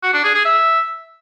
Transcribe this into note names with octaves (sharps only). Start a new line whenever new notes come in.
F#4
D4
G#4
G#4
E5